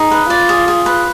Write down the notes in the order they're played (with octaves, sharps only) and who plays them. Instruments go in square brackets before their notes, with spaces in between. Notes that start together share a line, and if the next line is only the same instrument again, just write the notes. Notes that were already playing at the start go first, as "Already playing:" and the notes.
Already playing: [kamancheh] D#4 [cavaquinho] G#4
[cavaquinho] B4
[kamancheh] F4 [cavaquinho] D5
[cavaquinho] G#4
G#4
B4